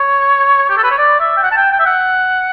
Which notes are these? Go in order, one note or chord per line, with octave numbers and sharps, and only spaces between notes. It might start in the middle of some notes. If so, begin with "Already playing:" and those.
Already playing: C#5
G4
A4
B4
C#5
D5
E5
G5
F#5
A5
G5
G5
E5
F#5